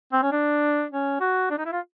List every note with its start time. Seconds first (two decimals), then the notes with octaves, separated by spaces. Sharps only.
0.12 C4
0.22 C#4
0.32 D4
0.91 C#4
1.20 F#4
1.50 D4
1.58 D#4
1.65 E4
1.72 F4